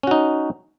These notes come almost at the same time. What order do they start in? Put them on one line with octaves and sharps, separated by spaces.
C#4 F#4 D#4